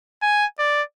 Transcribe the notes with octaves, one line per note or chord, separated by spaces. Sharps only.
G#5
D5